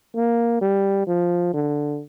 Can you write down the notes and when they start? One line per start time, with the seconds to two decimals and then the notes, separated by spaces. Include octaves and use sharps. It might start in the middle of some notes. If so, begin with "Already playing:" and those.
0.16 A#3
0.61 G3
1.07 F3
1.54 D3